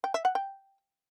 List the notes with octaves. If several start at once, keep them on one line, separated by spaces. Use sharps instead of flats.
G5
E5
F#5
G5